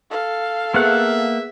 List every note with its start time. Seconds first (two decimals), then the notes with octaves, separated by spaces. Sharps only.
0.11 A4 F5
0.74 A#3 B3 G#4 B4 E5 F#5